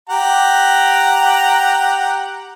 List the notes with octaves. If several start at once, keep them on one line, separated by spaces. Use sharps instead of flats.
G4 F#5 A#5